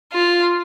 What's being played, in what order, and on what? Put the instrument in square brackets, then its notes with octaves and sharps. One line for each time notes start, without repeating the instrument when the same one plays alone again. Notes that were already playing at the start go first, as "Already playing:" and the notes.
[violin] F4